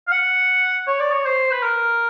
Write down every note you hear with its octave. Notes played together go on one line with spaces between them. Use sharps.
F5
F#5
C#5
D5
C#5
C5
B4
A#4